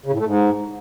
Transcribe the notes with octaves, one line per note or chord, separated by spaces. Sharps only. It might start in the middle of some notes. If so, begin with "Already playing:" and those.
C#3
A2
A3
G#2